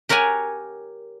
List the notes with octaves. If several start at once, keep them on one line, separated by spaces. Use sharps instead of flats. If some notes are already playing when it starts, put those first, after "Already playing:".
G4 A#4 C#5 F#5 G#5